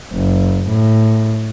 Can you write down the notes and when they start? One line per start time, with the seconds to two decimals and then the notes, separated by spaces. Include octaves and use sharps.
0.13 F#1
0.67 A2